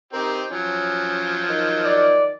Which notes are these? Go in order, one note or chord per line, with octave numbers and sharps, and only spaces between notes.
C4 D#4 G4 A#4
F3 F#3 C#4
D#3
D5